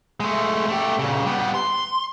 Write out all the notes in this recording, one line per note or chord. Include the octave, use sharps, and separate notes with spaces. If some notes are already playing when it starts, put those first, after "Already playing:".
G#3 A3
A3 G4
A#2 C#3
G3 B3
C6